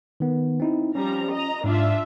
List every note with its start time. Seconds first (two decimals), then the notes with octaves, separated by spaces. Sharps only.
0.20 D#3 B3
0.60 C4 D#4 E4
0.95 F3 G3 C#4 A#5
1.31 D#5 A#5
1.64 G#2 D4 F4 E5